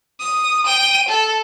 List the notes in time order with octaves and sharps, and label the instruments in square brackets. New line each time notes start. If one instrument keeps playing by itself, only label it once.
[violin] D#6
G5 D#7
A4